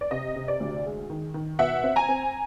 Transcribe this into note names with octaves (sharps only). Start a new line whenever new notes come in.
D5
C3 D#5
C3
D5
D2
G#3
D#3
D#3
B2 E5 F#5
C4
G#5 A#5
C4